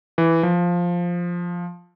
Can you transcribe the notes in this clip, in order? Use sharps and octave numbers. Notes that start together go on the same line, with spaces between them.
E3
F3